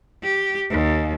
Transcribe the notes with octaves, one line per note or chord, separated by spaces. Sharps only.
G4
D#2